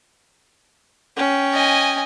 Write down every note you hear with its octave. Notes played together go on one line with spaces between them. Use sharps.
C#4 G5
D#5 G#5